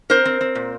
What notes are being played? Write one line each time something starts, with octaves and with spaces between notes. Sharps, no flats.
C4 A#4 C5
C4
C4
A#2